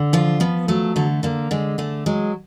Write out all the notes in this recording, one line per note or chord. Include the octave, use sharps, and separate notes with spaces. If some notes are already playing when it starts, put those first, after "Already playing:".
Already playing: D3
F3 F4
F3 B3
F#3 A3
D3 A3
D3 A#3
D3 G#3
D3 A3
F#3 G#3